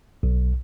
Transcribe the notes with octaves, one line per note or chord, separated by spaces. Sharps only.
B1